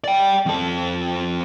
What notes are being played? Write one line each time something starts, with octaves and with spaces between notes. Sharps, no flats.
D5 G5
F2 A4